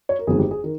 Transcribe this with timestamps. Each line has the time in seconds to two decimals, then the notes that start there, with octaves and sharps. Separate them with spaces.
0.09 C#5
0.19 A#4
0.27 G1 F2 D#3 G#3 G#4
0.39 G4
0.51 G#4
0.63 D#3 A#4